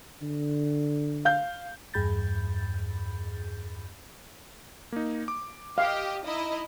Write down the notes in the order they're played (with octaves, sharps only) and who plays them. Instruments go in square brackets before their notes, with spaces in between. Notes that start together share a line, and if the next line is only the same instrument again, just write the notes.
[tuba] D3
[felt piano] F5 G6
[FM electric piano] E2 G2 G#4 B5 G6 A6
[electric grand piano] A#3 D#4
D6
[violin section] G4 D#5 [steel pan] F5
[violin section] D#4 E4 D#5